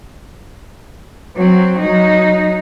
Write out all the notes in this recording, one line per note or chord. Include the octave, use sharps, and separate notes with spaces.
F#3 C4
F#3 D#4